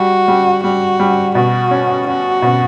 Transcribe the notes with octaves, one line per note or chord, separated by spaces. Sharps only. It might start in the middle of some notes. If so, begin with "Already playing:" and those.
Already playing: G3 F#4
G3
G3 F#4
G3
B2 F#4
C#4
C#4 F#4
B2